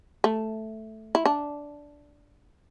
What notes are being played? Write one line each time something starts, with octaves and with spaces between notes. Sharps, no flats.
A3
E4
D4